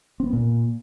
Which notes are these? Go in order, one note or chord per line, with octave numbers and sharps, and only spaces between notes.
C4
B3
A#2